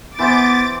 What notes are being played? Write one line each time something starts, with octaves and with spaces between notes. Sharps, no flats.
E3 B3 C5 D6 A6